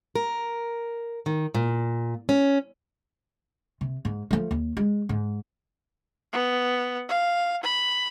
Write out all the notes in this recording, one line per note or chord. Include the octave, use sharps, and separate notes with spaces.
A#4
D#3
A#2
C#4
C3
G#2
F3 A3
D#2
G#3
G#2
B3
F5
B5